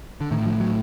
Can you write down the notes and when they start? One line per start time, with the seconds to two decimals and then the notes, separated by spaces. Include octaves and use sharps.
0.21 D3
0.31 A2 D#3
0.46 F3
0.60 F#3